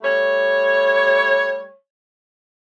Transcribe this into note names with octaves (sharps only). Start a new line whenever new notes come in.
G3 A3 C#5